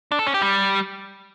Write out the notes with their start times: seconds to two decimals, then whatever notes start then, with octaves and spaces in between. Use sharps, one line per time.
0.12 D4
0.19 A4
0.27 C#4
0.34 G4
0.42 G3